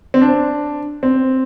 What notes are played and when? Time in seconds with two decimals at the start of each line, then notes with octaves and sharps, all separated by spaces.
0.14 C4
0.22 D4
1.03 C4